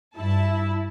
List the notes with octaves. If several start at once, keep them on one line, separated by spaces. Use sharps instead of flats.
G2 E4 A5